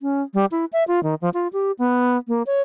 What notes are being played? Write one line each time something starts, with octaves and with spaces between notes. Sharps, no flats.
C#4
G3
E4
E5
F4
D#3
F3
F4
G4
B3
A#3
C#5